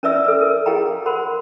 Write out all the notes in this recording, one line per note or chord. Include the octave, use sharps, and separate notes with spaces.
C#4 B4 D5 E5 E6
A4 B4
A#4
F#4 G#4 F5 G5 A#5
A#4 C5 F#5 B5 C6